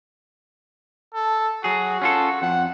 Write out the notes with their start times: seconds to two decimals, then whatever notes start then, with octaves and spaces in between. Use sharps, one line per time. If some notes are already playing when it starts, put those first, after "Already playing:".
1.15 A4
1.64 F#3 F#4 G#4
2.02 C#4 F4 A4
2.42 F2 F#5